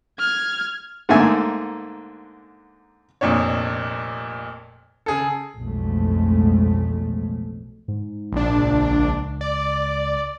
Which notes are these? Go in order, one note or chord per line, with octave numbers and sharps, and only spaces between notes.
F6 G#6
G#2 D3 A3 A#3 E5 G#5
F1 F2 A#2 D4 C#5
C#3 G#4 A4
B1 F2 A2 G#3 A3
G#2
A#1 D4
C#2
D5